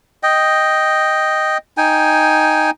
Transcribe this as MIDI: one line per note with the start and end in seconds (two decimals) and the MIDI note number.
0.23 1.58 75
0.23 1.58 79
1.77 2.70 63
1.77 2.70 79
1.77 2.70 80